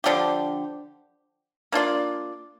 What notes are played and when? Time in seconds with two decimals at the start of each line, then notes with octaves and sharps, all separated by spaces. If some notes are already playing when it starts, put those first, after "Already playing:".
0.04 D3 F3 D4 G4
1.72 A#3 D4 F4 D5